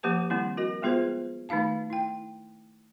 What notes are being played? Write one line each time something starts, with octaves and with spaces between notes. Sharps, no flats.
F3 A#3 G4 B4 A5
D#3 G3 A#3 C4 E4
F#4 A#4 D#5
G#3 B3 F4 G#4 B4 C5
D#3 A3 D#4 F5 A5
E4 G5